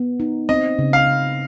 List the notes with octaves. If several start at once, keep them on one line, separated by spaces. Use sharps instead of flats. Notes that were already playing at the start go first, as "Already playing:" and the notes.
Already playing: B3
D#4
C4 D#5
C#3
F5
C#3